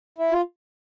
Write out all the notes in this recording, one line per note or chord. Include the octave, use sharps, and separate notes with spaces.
E4
F4